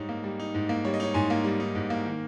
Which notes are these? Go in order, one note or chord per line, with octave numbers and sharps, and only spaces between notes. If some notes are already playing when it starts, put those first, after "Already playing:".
Already playing: G#2 G3 D#4 C#5
A#3
G3
D#4
G#2
A#3
G3 C#5
D#5
D#4 C#5
G#2 G#5 C6
A#3
G3
D#4
G#2
A#3
D#3